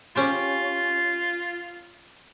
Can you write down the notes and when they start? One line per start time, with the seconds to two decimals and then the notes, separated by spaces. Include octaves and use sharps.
0.15 C#4 F4 G4 C6